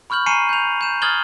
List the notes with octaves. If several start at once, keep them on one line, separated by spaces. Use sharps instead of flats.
B5 C#6 F6 G6 F#7
G#5 A#5 C#6 C7 C#7 D#7
G6 F7
G6 E7
D#6 F6 G#6 A6 F#7 G7